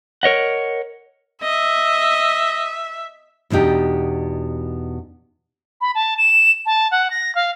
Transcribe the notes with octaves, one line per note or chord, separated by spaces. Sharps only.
A#4 C#5 D#5 F#5
D#5 E5
E2 B2 D4 D#4 G4
B5
A5
E7
A5
F#5
A#6
F5